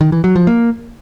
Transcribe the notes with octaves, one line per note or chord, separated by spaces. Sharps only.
D#3
E3
F#3
F3
A#3